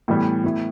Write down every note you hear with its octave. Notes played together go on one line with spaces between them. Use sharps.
A2 E3 G3 B3
A2 E3 B3 E4